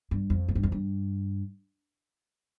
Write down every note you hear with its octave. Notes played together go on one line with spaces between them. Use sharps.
G2
F2
G#2
G2
F2
G2